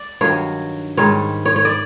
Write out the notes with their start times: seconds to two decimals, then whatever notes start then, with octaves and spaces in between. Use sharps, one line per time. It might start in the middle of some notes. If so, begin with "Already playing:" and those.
Already playing: D5
0.21 G2 D#3 F#3 C#5
0.97 G#2 D#3 G3 C#5
1.46 C#5
1.56 C#5
1.65 D5